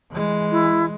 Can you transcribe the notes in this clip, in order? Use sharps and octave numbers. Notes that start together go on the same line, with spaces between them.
E3 G#3
E4